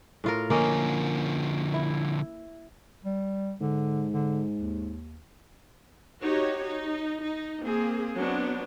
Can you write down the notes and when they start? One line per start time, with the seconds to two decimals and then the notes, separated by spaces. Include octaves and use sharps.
0.24 A2 F4 A#4
0.50 D3 F3 A#3 C#4 D#5
1.74 E4
3.05 G3
3.61 G#2 D3
4.14 D3
4.58 D#2
6.22 D#4 F#4 G4 C#5
6.64 D#4
7.23 D#4
7.64 A#3 C4 G#4
8.18 F#3 B3 C4 D4 F#4